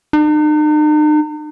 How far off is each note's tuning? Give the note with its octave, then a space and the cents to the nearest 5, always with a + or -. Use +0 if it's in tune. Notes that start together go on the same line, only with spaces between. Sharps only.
D#4 -45